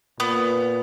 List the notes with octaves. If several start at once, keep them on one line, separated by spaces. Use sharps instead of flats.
A#2 B3